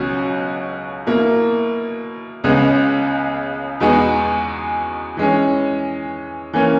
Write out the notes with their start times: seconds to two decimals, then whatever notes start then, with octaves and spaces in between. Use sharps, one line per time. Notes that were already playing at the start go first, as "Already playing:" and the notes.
Already playing: C#2 B2 F#3 C#4 F#4
1.07 B2 A#3 E4
2.44 C#2 C#3 G#3 B3
3.80 E2 B2 G#3 B3 D#4
5.17 E3 G#3 C#4
6.53 E3 A#3 C#4